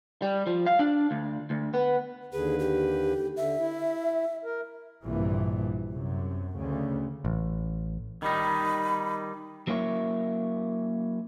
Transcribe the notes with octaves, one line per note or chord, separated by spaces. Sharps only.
G3
F3
F5
D4
D2
D2
B3
D#2 D3 G#4 B4
G4
D3 E5
E4
A#4
A#1 G2 C3 E3
F#2 C3
D2 C#3
A1
D#3 G3 D#4 B5
F#3 A#3 C#4 E4 C#5